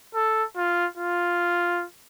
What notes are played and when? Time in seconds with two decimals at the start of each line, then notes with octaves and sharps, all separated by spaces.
0.14 A4
0.57 F4
0.97 F4